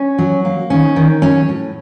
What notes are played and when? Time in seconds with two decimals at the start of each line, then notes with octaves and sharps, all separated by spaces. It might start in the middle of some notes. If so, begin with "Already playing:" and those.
Already playing: C#4
0.18 F#3
0.45 A#3
0.70 D#3 C#4
0.96 D#3
1.22 F#3 C#4
1.48 A2